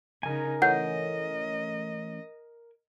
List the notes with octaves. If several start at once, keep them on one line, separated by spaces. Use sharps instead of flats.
C#3 D#4 A#4 G#5
E3 A3 C#4 D#5 F#5 G6